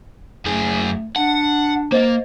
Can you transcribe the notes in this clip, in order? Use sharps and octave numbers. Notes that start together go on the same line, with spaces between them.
F#2 A3 G#4
D4 F#5 A5
A#3 C5 D#5 F5